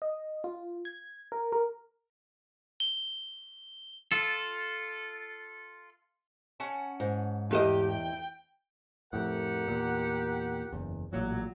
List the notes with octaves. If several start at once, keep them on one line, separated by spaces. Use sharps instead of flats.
D#5
F4
G#6
A#4
A#4
G7
F4 A4
C#4 F#5 A5
G#2
E2 G4 A4 D#5
G5
F2 A2 G4 A#4 F#5
E2 A#2
F#1 E2
A1 A#2 F#3